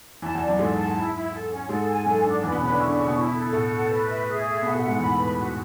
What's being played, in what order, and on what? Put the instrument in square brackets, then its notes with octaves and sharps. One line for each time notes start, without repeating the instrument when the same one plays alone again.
[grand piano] E2 E3 [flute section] A5
[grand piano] E2 E3
[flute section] D5
[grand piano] F#2 F#3
[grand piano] G#2 G#3 [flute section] A4
[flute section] A5
E4
E4
A4
C#4
[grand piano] G#2 G#3 [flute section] A4
[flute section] G#5
[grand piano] F#2 F#3 [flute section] A4
[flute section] D4
[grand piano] E2 E3 [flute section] B4
[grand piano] B2 B3
[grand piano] C#3 C#4 [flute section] B4
[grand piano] D3 D4
[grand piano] E3 E4 [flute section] C#6
[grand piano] D3 D4
[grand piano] C#3 C#4 [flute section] C#6
[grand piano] B2 B3
[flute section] E4
A4
[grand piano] A2 A3 [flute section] F#5
[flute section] A4
B4
E5
G#4
E5
[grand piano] B2 B3 [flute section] F#5
[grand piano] A2 A3
[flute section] F#5
[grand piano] G#2 G#3
[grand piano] E2 E3 [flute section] B5
[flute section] B4
F#4